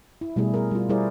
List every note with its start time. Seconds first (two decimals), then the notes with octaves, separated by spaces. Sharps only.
0.21 E4
0.36 B2 G3 A3 E4 G#4
0.54 G#4 A#4
0.71 G3 F4
0.89 G3 E4 G#4 A#4 C5 D5